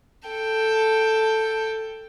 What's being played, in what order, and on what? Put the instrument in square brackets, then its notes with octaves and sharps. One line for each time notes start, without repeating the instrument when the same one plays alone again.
[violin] A4 G5